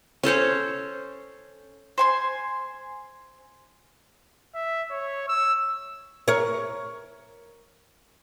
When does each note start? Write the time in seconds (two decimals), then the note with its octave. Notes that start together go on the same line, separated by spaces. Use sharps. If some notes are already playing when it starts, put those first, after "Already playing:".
0.23 C#4 A4 C5 C#5
1.98 C5 G#5 C6
4.55 E5
4.91 C#5
5.28 E6
6.28 A#4 C#5